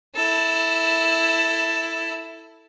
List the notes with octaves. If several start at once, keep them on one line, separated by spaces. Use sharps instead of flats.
E4 A4